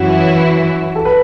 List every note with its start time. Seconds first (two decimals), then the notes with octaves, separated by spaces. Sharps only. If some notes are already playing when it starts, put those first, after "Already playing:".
Already playing: F#2 E3 C#4 E4 F#4
0.96 A4
1.05 B4